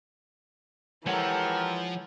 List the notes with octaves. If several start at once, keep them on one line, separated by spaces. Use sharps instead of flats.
E3 F3 G#3 G4 A4 A#4 C#5 F#5